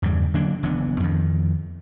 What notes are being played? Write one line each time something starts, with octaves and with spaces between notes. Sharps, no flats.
E2 G2 C#3 G3
D3 F#3 A#3 D4
F#1 E3 B3 D4
F2 D#3